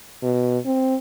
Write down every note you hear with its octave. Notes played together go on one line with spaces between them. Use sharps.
B2
C4